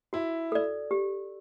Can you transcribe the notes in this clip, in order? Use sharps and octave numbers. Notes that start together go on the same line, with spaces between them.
E4 F#4
A4 D5
G4